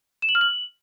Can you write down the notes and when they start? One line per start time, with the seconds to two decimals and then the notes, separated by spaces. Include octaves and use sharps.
0.22 E7
0.29 F#7
0.35 F6
0.41 F#7